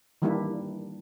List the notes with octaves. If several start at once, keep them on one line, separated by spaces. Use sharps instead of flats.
D#3 E3 G3 A#3 D4 E4